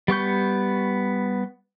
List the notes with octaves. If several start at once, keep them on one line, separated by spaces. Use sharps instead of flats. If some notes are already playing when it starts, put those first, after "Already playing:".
G3 B3 C#6 G6